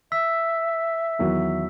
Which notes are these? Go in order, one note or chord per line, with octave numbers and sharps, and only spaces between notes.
E5 E6 B6
E2 D#3 F#3